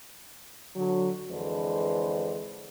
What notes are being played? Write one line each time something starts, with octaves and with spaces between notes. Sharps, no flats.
D3 F#3
F2 D3 E3 G#3 B4 C5